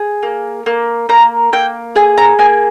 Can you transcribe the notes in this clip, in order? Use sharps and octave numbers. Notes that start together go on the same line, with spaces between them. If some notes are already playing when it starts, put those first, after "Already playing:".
Already playing: G#4
A#3
A#3
A#3 A#5
A#3 G5
G#4 G#5
A#5
A#3 G#5